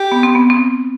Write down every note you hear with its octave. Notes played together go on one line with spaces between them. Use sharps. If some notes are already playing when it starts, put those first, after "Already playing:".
Already playing: G4
B3
C4
B3
C4